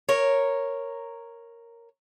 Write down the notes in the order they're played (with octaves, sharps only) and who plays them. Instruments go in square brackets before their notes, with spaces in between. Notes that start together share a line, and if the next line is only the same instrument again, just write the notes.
[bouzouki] A#4 C#5